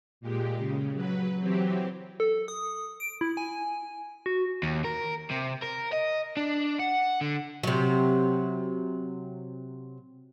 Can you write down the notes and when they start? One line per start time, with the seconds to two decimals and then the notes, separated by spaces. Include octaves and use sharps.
0.21 A#2 G#3 G4
0.58 C#3
0.94 F#3 B4
1.39 E3 F#3 C4 G4
2.20 A4
2.48 D#6
3.00 D7
3.21 E4
3.37 G#5
4.26 F#4
4.63 D#2
4.84 A#4
5.31 C3
5.63 A#4
5.93 D#5
6.37 D4
6.79 F#5
7.21 D3
7.63 C3 F#3